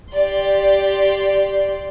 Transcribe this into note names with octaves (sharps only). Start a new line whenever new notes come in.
G4 D5 C6